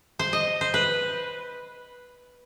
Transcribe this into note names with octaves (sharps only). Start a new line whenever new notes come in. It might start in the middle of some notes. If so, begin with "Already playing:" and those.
C5
D#5
C5
B4